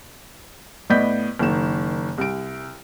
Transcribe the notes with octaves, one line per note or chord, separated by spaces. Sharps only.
A2 B3 D5 D#5 G6 B6
F#1 D#3 E7
C2 D7